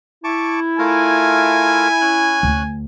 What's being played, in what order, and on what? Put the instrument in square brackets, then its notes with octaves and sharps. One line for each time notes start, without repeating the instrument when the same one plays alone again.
[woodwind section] E4 [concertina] A5 C#6 D6
[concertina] A3 F4 A#4 [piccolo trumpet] G#5
[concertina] C#4 F#6
[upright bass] D2